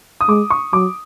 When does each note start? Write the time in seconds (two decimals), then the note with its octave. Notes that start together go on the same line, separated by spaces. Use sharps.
0.21 D#6
0.29 G#3 D6
0.50 C#6
0.73 F#3 D6